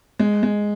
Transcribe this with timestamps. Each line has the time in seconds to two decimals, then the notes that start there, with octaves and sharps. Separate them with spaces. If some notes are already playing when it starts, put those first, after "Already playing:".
0.19 G#3
0.43 G#3